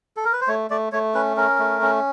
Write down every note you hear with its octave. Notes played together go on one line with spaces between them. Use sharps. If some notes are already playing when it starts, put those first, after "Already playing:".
A4
A#4
B4
C5
A3 C#5
A3 D5
A3 C#5
C#4 B4
C#4 A#4
A3
C#4